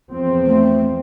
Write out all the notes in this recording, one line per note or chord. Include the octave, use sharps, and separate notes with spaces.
E2 F3 C4
A3